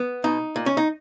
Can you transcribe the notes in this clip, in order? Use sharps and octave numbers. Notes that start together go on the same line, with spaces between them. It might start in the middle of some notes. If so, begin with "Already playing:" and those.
Already playing: B3
B2 D#4
A#2
C#4
D#4